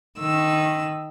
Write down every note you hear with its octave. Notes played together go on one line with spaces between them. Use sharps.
D#3 E6